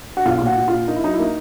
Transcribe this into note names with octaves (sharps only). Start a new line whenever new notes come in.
F#4
B1 F4
A#2 F4
F#4
A#2
F4
A#2
A#3 D#4
E4
F#3 D#4
E4
A#3 D#4